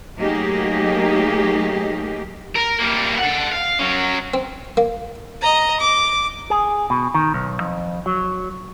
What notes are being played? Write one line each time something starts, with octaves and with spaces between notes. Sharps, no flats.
F#3 A3 A#3 D#4 G4 G#4
A#4
G3 A#3
A4 F#5
F5
F#3 C#4
C4
A#3
D#5 A#5
D6
G#4
B2
D#3
B1
F2
F#3